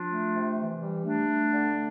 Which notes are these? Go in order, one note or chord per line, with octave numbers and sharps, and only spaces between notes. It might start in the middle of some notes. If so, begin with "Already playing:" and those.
Already playing: F3 D4 F4
A3
C3
E3
G3
A3 D4
A3
D3
A3